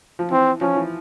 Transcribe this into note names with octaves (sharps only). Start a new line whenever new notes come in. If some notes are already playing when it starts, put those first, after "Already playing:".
F3
E3 C4
F3 C#4
E3